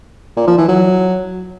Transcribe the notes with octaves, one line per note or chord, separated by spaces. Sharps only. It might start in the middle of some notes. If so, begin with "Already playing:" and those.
A#2
F3
E3
F#3